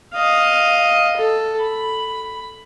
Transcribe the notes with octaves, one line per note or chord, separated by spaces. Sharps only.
D#5 F5
A4
B5